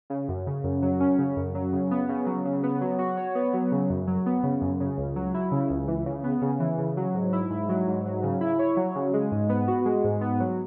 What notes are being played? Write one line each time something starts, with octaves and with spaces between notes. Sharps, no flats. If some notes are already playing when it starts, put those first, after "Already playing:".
C#3
F#2
C#3
F#2
F#3
C#4
C#3
F#2
F#3
C#3
B3
C#3
F#3
C#3
B3
F#3
F#4
C#5
B3
F#3
C#3
F#2
F#3
B3
C#3
F#2
C#3
C#2
F#3
E4
C#3
C#2
E3
C#3
B3
C#3
E3
C#3
F#3
G#2
E4
G#2
F#3
G#2
F#3
C#3
E4
C#5
F#3
C#3
G#3
G#2
B3
F#4
G#3
G#2
B3
F#3